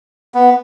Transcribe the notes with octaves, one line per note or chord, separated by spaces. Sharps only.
B3